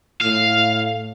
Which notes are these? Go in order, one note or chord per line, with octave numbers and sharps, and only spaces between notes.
A2 F5